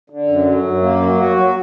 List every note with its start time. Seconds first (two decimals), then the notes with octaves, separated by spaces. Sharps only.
0.10 D3
0.28 F#2
0.45 F#3
0.64 F#2
0.82 A#3
1.00 F#3
1.18 F#4
1.37 F#3